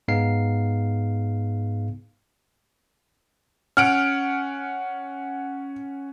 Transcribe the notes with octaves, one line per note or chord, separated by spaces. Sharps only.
G#2 B3 D#4 G#4 F5 C7
C#4 F#5 F6 D7